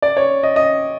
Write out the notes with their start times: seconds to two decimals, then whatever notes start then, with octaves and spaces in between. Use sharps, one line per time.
0.02 D5
0.17 C#5
0.43 D#5
0.56 D#5